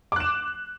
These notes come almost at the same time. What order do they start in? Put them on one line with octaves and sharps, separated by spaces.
D6 F#6 E7